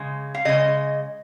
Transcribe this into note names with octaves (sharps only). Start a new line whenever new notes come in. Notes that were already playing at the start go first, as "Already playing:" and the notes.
Already playing: C#3 G#3
F5
C#3 G#3 D#5